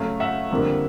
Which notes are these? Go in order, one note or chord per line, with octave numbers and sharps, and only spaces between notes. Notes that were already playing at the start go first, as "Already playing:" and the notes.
Already playing: C#3 F#3 A3 F5
E5 F#5
F2 D3 G3 A#3 D4